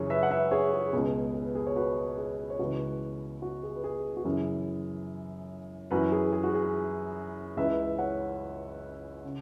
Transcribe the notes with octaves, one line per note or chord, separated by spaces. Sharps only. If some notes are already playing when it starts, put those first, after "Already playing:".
Already playing: F#2 C#3 E3 G#4 C#5
B4 E5
F#5
B4 E5
G#4 C#5
G#4
C#2 B2 G#4
G#4
B4
G#4
C#5
F#4 B4
G#4
C#5
C#2 C#3 E3 F#4 B4
F#4
G#4
B4
G#4
F#4
F#2 C#3 E3 G#4
F#2 E3 F#4 B4
G#4
G#4
F#4
G#4
C#2 C#3 E3 B4 E5
C#5 F#5
C#3